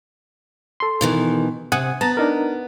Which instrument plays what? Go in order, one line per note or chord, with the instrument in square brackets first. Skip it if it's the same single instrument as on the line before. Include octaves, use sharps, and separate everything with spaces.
[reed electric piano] A4 C6
[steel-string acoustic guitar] B2 D#3 E3
[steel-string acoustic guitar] C3 [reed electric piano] F#5 G#5 D#6
[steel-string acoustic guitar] B3 [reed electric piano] A5 A#5 A6
[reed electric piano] D4 D#4 A#4